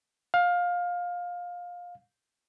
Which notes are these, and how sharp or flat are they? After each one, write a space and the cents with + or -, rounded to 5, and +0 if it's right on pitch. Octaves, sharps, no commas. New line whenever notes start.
F5 +20